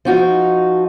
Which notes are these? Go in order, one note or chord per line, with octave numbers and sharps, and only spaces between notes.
F3 D#4 F#4